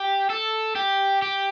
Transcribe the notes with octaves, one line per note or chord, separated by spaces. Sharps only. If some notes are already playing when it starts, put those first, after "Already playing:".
Already playing: G4
A4
G4
G4